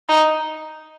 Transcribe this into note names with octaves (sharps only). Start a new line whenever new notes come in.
D#4